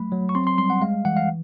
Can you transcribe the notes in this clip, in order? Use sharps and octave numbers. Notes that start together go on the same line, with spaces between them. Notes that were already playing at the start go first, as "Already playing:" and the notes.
Already playing: F#3 A3 B5
F#3
C#6
C4 C6
C6
G3 C6
F#5
G#3 F5
E3 F#5
F5